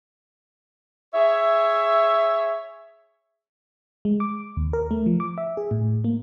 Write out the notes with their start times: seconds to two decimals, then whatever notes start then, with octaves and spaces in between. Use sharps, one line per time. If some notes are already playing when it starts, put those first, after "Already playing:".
1.14 G#4 C#5 E5
4.05 G#3
4.20 D6
4.57 D#2
4.73 A#4
4.91 A3
5.06 F3
5.20 D6
5.38 E5
5.57 G#4
5.71 A2
6.04 A#3